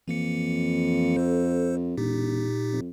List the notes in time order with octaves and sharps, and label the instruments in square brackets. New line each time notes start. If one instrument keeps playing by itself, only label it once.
[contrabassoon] F2 [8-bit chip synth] E3 A#3 C#7
[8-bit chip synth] A4 C5
[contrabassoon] E1 [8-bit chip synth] A#2 D#4 G4
[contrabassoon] F2